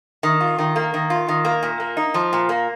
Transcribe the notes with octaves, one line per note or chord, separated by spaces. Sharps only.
D#3
F4
D#3
A#3
D#3
F4
D#3
A#3
A#2
A#3
D#4
F3
A#2
A#3